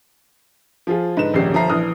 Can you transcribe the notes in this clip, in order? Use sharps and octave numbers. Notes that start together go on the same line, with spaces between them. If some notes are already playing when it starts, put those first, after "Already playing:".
F3 F4 G#4
G#2 D3 B4 E7
D#1 A#1 G#3 C#4 G4 C7
G1 F3 E5 A#5 C7
A#1 E3 D#6 F6